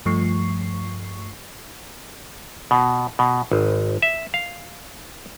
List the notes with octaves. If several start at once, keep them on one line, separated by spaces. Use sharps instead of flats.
G2 F3 A3 C#6 C7
B2
B2
G#1
E5
F5